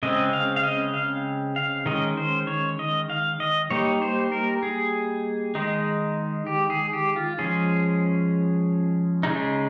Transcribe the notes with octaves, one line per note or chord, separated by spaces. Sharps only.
C#3 G#3 C4 D#5
F5
F5
D#5
F5
F5
D#3 G#3 C#4 D#5
C5
C#5
D#5
F5
D#5
G3 A#3 D#4 C#5
C5
A#4
G#4
D#3 G#3 D#4
G4
G#4
G4
F4
F3 G#3 C#4 G#4
C#3 G#3 D#4